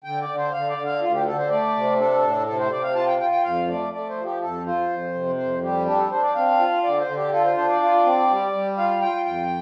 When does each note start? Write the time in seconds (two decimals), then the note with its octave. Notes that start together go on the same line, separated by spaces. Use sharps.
0.04 D3 G5
0.21 D5
0.29 D3
0.38 C5
0.53 D3 F5
0.69 D5
0.78 D3
0.86 F5
1.01 D2 F4
1.13 G4
1.26 D3 A4
1.38 C5
1.50 A3 D5
1.75 C3
1.99 D4 A4
2.23 A2
2.46 C3 A4
2.59 C5
2.71 C3 D5
2.83 F5
2.95 F4 A5
3.07 G5
3.20 F4 G5
3.32 G5
3.44 F2 F5
3.68 A3 D5
3.93 A3 D5
4.09 C5
4.17 F3
4.24 G4
4.41 F2 A4
4.66 F4 C5
4.90 F2
5.14 C3
5.37 F2 C5
5.61 G3 G4
5.86 D4 G4
5.98 A4
6.11 D4 C5
6.23 D5
6.35 C4 F5
6.59 F4
6.83 D3 D5
7.00 C5
7.07 D3
7.16 G4
7.31 F4 A4
7.44 C5
7.56 D4 C5
7.69 D5
7.80 F4
8.04 C4
8.29 G3
8.53 G3
8.77 F4 F5
9.01 F4 G5
9.25 F2 G5